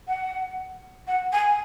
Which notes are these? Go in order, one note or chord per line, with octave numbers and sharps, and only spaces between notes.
F#5
F#5
G#5